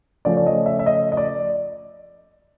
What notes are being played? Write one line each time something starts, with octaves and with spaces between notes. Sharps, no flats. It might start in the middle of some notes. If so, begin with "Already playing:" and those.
C#3 F3 A3 C#4 D5
D5
D#5
E5
E5
D#5
D#5
D5